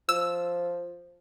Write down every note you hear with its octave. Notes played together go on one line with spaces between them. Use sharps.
F3 E6